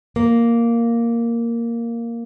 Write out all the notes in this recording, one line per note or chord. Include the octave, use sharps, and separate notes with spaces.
A#3